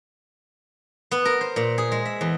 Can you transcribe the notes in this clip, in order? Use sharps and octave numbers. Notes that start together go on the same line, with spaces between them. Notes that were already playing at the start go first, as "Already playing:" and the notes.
B3
A#4
C5
A#2
G#4
G#3
E5
E2